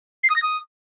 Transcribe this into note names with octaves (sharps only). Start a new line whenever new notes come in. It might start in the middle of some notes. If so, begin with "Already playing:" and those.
C7
D#6
A#6
D#6